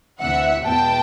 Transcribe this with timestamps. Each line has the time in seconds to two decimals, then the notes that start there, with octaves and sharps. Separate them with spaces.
0.20 D2 C3 E3 E5 F#5
0.65 E2 B2 G#3 B3 G5 A5